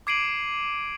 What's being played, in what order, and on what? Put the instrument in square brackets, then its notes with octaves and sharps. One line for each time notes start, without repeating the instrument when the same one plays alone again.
[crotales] D6 G#6 C7 D7 D#7 F#7